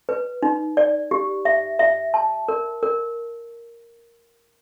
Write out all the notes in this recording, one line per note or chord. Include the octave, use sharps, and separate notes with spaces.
B4
D#4
D5
G4
E5
E5
A5
A#4
A#4